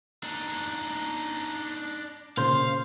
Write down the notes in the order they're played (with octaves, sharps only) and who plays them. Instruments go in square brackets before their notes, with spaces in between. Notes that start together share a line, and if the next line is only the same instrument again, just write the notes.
[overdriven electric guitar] D4 D#4
[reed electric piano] A#2 C#3 [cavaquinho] C5 [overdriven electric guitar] F5